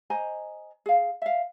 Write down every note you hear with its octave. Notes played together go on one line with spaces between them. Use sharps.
C5 D#5 G#5 A#5
G#4 F5
E5 F5